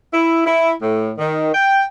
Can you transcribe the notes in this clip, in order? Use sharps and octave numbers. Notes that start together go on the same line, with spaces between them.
E4
E4
A2
D#3
G5